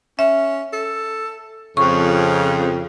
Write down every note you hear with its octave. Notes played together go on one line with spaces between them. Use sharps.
C#4 E5
A4
F2 C#3 C#6